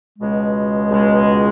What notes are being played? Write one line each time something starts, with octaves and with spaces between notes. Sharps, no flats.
C#2 B2 G#3
C#2 B2 G#3